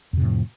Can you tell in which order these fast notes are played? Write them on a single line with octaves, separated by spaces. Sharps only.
F2 C3 A2 F3